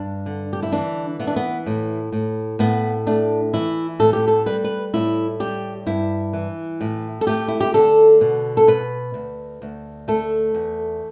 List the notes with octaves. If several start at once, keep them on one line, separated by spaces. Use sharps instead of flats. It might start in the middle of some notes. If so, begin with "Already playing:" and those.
Already playing: G2 D4
D3
G4
E4
E3 D4
E3 B3
D4
B3
A2
A2
A2 B3
A3 D4
E3 E4
A2 A4
G4
A4
G3 B4
B4
A2 E4
G3 G4
G2 E4
E3
A2
A4
A3 G4
E4
G4
D3 A4
B2
A4
B2 B4
D2
D2
A3 A4
E2